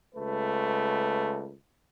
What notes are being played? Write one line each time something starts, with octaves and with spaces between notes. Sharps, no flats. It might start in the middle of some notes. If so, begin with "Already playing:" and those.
C#2 A3 B4